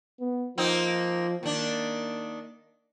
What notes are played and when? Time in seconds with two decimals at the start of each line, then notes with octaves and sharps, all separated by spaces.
0.20 B3
0.58 F3 A#3 C4 D#4
1.43 D#3 A#3 D4